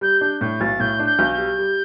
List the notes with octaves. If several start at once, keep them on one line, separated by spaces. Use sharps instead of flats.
G3 G6
D4 G6
A2 G6
B1 A6
A2 G6
D4
G6
B1
G6
G3
G3